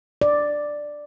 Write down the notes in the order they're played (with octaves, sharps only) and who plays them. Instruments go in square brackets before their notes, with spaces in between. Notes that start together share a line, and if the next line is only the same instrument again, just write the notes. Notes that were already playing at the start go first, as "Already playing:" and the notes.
[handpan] D5